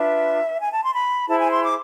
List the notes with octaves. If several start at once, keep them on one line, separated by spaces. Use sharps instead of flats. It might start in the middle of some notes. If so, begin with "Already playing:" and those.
Already playing: D4 F4 B4 E5
G#5
A5
C6
B5
E4 G#4 C5 A5
G#5
C6
D6